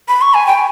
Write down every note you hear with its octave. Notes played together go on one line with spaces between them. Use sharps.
B5
C#6
G#5
G5